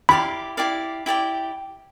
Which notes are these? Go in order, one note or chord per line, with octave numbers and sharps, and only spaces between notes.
E4 G4 D5 F5 B5
E4 G4 D5 F5
E4 G4 D5 G5